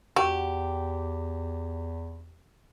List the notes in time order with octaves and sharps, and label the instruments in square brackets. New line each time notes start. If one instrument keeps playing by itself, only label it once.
[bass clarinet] E2 [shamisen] F#4 [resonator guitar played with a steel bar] G4